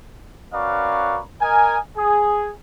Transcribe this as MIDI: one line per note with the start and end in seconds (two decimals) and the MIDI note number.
0.53 1.20 61
0.53 1.20 66
0.53 1.20 70
0.53 1.20 71
0.53 1.20 74
0.53 1.20 77
1.41 1.77 70
1.41 1.77 75
1.41 1.77 80
1.97 2.51 68